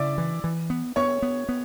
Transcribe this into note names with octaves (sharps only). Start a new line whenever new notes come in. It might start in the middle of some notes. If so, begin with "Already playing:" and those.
Already playing: C#3 E4 D5 E5 D6
E3
E3
B3
B3 C#5 C#6
B3
B3